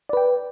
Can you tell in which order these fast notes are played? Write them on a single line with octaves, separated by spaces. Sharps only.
D5 B4 G5